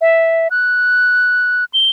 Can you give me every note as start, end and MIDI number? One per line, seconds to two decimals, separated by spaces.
0.01 0.48 76
0.51 1.65 90
1.74 1.90 103